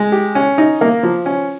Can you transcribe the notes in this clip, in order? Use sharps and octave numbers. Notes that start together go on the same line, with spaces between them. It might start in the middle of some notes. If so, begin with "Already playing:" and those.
Already playing: G#3
G4
C#4
D#4
A#3
F3
C#4